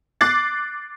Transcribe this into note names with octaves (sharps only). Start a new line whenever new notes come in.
D6 F#6 A6 C7